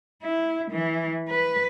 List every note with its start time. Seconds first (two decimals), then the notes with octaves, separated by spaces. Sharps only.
0.22 E4
0.71 E3
1.29 B4